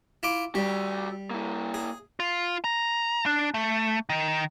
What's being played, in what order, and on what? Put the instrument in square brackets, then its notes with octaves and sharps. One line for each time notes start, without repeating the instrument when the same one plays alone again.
[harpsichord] E4 F4 D6
[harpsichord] G3 [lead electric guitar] F#4 D5
[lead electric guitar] A#3 E4
[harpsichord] G#4
[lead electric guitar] F4
A#5
D4
A3
D#3